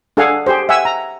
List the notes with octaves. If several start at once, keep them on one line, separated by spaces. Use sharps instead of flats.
D4 G#4 A4 F5 F#5 G#5
G4 G#4 C5
E5 F#5 G#5 E6
A#5